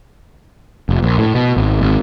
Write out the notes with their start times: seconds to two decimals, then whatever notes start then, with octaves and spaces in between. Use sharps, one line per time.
0.89 F1
1.03 A#1
1.18 A2
1.35 B2
1.57 G#1
1.82 G#1